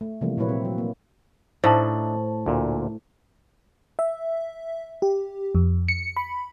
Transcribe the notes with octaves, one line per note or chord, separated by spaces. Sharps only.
A3
C3 E3 F3 G3 A3 A#3
A#2 F#3 A#3 E4 B4 C#5
C4
F#3
A#3
A2 D4 D#4 C5 E5 A5
D2 A#2
E5
G4
F2
C#7
B5